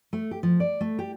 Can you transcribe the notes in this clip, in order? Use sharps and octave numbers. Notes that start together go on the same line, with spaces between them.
A3
G4
F3
D5
A3
G4